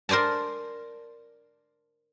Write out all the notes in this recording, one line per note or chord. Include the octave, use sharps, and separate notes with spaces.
A#4 C5 D5 G#5 A5